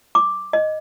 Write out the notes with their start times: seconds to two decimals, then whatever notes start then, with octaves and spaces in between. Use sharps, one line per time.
0.15 D6
0.53 D#5